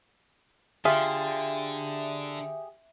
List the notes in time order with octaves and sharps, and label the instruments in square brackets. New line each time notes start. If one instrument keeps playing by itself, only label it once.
[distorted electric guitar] D3 [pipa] F4 [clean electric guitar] G4 G#4 [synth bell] E5